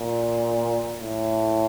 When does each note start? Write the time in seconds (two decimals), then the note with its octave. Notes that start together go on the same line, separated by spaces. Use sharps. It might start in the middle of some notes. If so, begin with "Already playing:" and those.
Already playing: A#2
1.02 A2